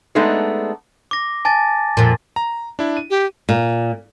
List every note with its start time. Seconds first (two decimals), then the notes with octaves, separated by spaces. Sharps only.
0.15 G#3 A3 B3 D4 D#4 G#4
1.11 D6 A#6
1.45 G#5 A5 A6
1.97 F2 A#2
2.36 A#5
2.79 D4 E4
2.97 D#7
3.10 G4
3.49 A#2